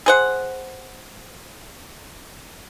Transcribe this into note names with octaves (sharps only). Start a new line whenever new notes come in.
G#4 C5 F#5